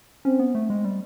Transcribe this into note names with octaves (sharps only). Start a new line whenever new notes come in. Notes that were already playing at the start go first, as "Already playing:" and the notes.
C4 C#4
B3
A3
G#3
G3